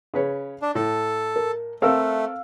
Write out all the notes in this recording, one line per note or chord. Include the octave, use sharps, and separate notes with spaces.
C#3 B4 C#5
D4
A2 A4
A#4
A3 C4 A4 A#4 F5 E6